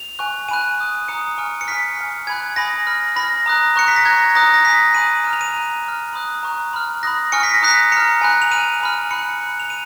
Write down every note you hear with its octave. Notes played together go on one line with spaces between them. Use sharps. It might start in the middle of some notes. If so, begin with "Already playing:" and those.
Already playing: F7
G#5 C#6 F#6
G#5 B5 F#6 D#7
G#5 D#6 F#6
A#5 D#6 F#6 C#7
G#5 C#6 F6
C#7
G#5 C#6 F6 B6
G#5 C#6 F6
G#5 B5 F#6 G#6
G#5 B5 D#6 A#6
B5 F6
B5 F6 A#6
A#5 D#6 F#6
A#5 C#6 F#6 C#7
B6
A#6
A#5 C#6 F#6 G#6
A#5 D#6 F#6 A#6
A#6
G#5 D#6 F#6 B6
G#5 B5 D#6 F#6 D#7
A#5 F6 D#7
F7
D#7
A#5 C#6 F#6
A#5 F6
B5 D#6 F#6
A#5 C#6 F#6
B5 F6
B5 D#6 F#6 A#6
G#5 C#6 F6 C#7
B6
A#6
A#5 D#6 F#6 B6
A#5 F6 C#7
G#5 B5 F#6
F7
G#5 B5 F6 D#7
G#5 B5 F6
B5 F#6 C#7
B5 F#6
F7
D#7